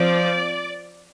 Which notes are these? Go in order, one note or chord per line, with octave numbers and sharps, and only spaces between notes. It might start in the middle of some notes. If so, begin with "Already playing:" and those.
Already playing: F3 C4 D5